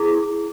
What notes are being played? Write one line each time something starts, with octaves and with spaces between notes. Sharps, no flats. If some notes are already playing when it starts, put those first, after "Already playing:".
Already playing: E4 G#4